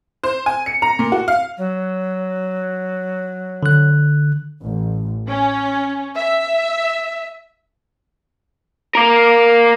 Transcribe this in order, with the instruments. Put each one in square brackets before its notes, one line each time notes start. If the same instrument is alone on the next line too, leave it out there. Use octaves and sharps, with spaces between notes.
[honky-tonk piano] C5
G#5
C#7
A#5
A#2
F#4
F5
[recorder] F#3
[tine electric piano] D3 F#6
[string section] A1
C#4
E5
[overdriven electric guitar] A#3 A#4